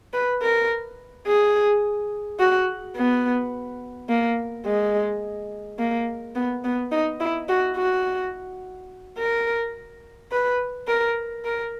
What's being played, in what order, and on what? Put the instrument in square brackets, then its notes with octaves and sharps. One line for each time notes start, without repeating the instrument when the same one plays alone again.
[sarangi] B4
A#4
G#4
F#4
B3
A#3
G#3
A#3
B3
B3
D#4
E4
F#4
F#4
A#4
B4
A#4
A#4